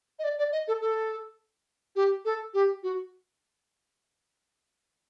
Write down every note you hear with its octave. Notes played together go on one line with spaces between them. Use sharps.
D#5
D5
D5
D#5
A4
A4
G4
A4
G4
F#4